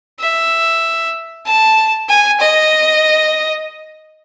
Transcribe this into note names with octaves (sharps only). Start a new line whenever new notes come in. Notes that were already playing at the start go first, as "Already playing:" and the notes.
E5
A5
G#5
D#5